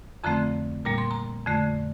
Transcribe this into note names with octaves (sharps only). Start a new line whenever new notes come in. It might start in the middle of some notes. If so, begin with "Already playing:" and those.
F2 D3 F3 A3 C4 A#5
A#2 G3 A#3 A#5
C6
A#5
F2 D3 A3